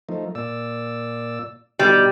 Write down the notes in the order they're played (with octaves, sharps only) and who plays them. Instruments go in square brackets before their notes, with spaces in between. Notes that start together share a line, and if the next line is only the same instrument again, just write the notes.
[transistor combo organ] F3 A3 D#4
A#2 D5 E6
[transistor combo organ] B2 D#4 [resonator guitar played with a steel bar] G3